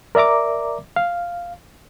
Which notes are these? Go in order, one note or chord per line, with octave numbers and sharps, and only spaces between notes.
A#4 D5 E5 A#5 D6
F5